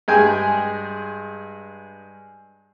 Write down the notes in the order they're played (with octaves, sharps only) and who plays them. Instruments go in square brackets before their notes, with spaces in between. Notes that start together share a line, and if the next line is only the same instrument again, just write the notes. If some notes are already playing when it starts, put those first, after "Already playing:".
[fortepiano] G2 G#3 G#4 G5 G#5